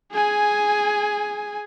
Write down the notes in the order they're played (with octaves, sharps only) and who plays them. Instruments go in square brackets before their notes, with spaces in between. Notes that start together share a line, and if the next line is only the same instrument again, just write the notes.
[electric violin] G#4 G#5